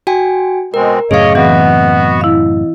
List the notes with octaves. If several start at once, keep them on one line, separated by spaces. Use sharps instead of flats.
F#4 G5 G#5
B2 G#3 C4 A#4
F#2 A2 C#3 G#4 C#5 D#5 F5
E3 B3 C4 F#4 D#5
E4 F5